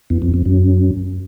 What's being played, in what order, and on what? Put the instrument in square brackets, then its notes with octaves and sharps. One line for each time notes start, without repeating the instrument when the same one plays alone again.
[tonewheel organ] E2
F2
F2
F#2